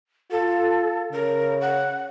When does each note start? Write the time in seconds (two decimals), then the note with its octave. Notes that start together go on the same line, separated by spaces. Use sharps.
0.31 F4 A4
1.13 C#3 A#4
1.61 F#5